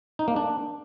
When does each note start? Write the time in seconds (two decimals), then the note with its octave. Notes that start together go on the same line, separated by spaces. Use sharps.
0.19 D#4
0.28 A#3
0.36 D4